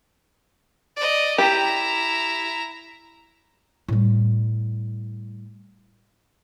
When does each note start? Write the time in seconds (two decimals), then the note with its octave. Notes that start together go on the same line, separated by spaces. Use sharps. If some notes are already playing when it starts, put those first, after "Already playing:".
0.97 D5 D#5
1.38 E4 G4 A#5
3.88 A2 G3